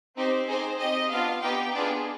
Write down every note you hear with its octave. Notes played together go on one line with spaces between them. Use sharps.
C4 D#4 G4 C5
C4 D#4 G#4 C5
C4 G4 D#5
B3 D4 F4 F5
B3 D#4 G4 G5
B3 D4 F4 G#4